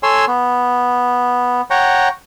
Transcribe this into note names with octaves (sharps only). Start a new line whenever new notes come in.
A4 C#5 G#5 C6 E6
B3
C#5 F#5 G5 A#5